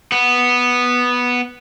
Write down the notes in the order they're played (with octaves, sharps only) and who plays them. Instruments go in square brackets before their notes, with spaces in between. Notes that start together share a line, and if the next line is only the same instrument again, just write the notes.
[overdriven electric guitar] B3